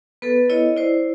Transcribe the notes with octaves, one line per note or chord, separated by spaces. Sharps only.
B3 A4 B4
E4 C#5 D#5
E4 C5 D5